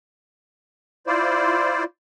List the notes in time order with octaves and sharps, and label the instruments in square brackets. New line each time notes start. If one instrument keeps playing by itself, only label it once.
[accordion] E4 F4 C5 D5